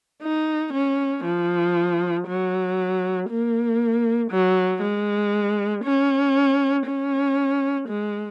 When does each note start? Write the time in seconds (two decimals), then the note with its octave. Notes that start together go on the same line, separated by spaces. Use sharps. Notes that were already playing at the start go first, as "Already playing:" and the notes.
0.22 D#4
0.73 C#4
1.24 F3
2.27 F#3
3.29 A#3
4.31 F#3
4.82 G#3
5.84 C#4
6.86 C#4
7.89 G#3